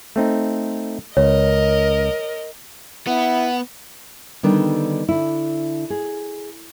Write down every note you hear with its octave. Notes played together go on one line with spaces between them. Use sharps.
A3 C4 D#4
C#2 A#4 C#5 D#5
B3 E4 F#5
D3 D#3 G3 B3 D4
D3 E4
G#4